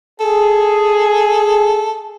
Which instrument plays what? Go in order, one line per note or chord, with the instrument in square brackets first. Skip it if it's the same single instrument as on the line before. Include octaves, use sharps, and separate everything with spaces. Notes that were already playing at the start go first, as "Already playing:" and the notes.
[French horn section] G#4 [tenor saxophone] A4